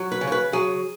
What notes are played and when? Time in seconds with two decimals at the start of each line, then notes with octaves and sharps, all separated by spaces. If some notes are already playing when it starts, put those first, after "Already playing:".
Already playing: F#3
0.12 B4
0.21 C#3
0.27 C#5
0.32 B4
0.53 F#3 G#4